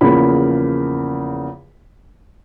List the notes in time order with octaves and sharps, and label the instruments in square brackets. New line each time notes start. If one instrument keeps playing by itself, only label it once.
[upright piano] E2 C#3 F3 A#3 B5